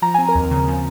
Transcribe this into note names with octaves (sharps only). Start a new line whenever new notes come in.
F3 A#5
C4 G#5
A#4 A#5
D#2
C#3
F3